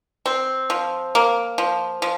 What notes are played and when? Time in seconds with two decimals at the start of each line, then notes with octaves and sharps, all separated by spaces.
0.26 C4
0.70 F3
1.15 A#3
1.58 F3
2.02 F3